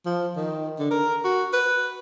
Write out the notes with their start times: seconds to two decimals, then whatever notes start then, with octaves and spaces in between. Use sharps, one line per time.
0.05 F3
0.36 D#3
0.79 D3
0.91 A#4
1.24 F#4
1.53 B4